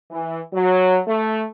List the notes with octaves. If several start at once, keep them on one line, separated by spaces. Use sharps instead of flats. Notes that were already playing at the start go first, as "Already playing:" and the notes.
E3
F#3
A3